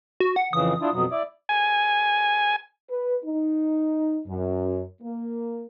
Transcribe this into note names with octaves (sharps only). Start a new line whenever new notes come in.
F#4
F#5
F2 C#3 E3 D#6
D4 E4 F4
F2 B2 F#3
E4 D5
G#5
B4
D#4
F#2
A#3